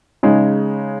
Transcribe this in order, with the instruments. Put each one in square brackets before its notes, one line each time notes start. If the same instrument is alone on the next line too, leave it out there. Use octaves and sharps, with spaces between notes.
[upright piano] C#3 G#3 D#4